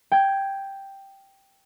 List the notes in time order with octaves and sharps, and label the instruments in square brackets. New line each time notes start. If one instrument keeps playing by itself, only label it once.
[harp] G5 G#6